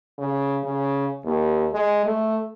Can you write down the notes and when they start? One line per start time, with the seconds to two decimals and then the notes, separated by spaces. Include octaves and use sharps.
0.19 C#3
0.64 C#3
1.25 D#2
1.72 G#3
2.06 A3